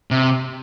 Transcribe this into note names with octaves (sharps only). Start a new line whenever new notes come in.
C3